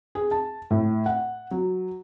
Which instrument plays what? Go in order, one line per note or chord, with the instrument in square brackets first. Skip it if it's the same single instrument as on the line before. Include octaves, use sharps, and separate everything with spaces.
[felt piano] G#4
A5
A2
F#5
F#3